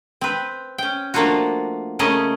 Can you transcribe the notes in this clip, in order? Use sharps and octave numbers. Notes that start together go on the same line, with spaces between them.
C4 B4
C#4 G5
F3 A3 A#3 D4 F4 F#4
C#3 A3 A#3 C#4 D#5